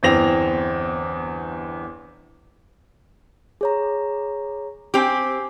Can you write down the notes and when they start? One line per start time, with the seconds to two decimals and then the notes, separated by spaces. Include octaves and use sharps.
0.03 G1 E2 C4 A#6 F7
3.61 G#4 C#5 A#5
4.94 C4 G4 G#5 D6